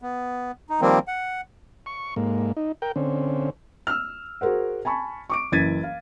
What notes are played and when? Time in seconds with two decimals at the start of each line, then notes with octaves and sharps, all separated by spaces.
0.02 B3
0.69 D#4
0.81 D#3 F3 G3 A#3 C4
1.08 F#5
1.86 C#6
2.16 G#2 A#3
2.57 D#4
2.82 A#4 G5
2.96 D3 C4 C#4
3.87 E6 F6
4.41 F#4 G#4 A#4 C5 F#5
4.85 G#5 A5 B5 C#6
5.30 C#6 D6 D7
5.52 F#1 E3 G#6 A6 B6 D#7
5.83 F5